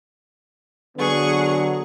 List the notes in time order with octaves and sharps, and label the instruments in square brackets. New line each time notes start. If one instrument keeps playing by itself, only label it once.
[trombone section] D3 F#3 B3 [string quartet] G#4 F#5 C#6